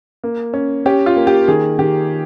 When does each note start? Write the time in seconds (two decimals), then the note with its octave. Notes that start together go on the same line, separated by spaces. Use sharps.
0.24 A#3
0.54 C#4
0.86 C#4 G4
1.06 F4
1.16 A#3
1.27 G4
1.48 D#3 G#4
1.79 D#3 G4